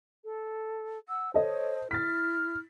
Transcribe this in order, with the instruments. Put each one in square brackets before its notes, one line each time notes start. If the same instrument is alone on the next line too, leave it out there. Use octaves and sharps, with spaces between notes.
[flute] A4
[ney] F#5 [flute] E6
[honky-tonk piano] A4 D#5 [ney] C5 [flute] C#5
[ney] E4 [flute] F6 [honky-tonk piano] A6 B6